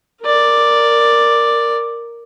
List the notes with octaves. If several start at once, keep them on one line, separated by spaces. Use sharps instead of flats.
A#4 D5